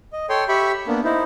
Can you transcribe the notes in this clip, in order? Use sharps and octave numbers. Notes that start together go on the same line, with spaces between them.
D#5
A4 C#5 G5 C6
G4 E5 B5 C#6
A#3 B3 D4
D#4 E4 C5